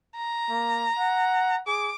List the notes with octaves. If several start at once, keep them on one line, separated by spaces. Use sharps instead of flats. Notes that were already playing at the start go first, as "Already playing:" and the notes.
A#5
A#3
F#5
G#4 D6